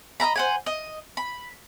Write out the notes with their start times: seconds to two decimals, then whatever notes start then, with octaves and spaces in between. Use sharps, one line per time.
0.20 D#5 F5 A#5 B5
0.36 C5 F#5 G#5
0.66 D#5
1.17 B5